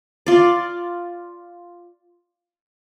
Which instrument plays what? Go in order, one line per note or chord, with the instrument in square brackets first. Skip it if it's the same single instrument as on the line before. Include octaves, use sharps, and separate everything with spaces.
[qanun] F4 D5